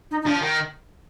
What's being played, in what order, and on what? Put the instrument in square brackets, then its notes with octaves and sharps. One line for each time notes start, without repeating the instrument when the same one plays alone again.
[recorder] D#4
D#4
[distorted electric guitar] F3 [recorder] D4
[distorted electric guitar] D#3